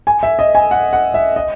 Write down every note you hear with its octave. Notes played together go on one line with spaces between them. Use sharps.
G#5
E5
D#5
G#5
F#5
F#5
E5
D#5